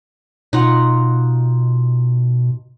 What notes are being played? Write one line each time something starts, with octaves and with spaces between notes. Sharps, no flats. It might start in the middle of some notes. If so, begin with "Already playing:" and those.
B2 D#4 F4 F#5